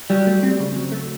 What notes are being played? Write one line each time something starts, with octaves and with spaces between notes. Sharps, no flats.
F#3 G3
A3
C4
C#3
F#3
A3